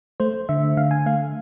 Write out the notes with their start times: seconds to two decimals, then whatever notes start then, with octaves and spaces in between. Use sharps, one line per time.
0.20 A3 C5
0.49 D3 E5
0.77 D3 F5
0.91 G#5
1.06 A3 F5